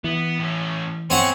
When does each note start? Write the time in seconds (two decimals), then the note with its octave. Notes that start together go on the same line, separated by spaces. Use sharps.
0.04 E3 B3
0.38 A2 C#4
1.10 B2 C4 C#5 F#5 G#5